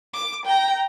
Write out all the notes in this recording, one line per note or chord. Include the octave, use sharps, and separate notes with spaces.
D6
G5 A#5